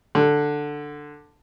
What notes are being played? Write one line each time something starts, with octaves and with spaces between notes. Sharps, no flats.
D3